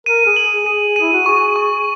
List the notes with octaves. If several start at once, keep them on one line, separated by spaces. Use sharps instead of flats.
A#4 D#7
G#4
F#7
G#4
G#4 D#7
D#7
E4
F#4
G#4 C#6
C#6